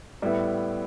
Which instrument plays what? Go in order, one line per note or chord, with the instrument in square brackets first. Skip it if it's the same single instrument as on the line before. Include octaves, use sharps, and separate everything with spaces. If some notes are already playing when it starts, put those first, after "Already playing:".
[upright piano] A2 G3 B3 E4